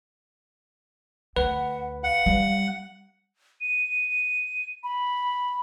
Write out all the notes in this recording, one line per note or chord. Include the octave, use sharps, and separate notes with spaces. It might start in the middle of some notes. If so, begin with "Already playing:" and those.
D2 B4 F#5
F5 F#5
G3
D#7
B5